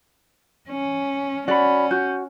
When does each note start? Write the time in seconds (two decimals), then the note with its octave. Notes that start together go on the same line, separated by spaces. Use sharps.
0.70 C#4
1.48 C#4 F#4 D5 F#5 B5
1.91 F#4 G6